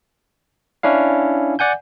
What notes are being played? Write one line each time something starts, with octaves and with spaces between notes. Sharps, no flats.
C#4 D4 E4 F5
D5 F#5 G#5 G6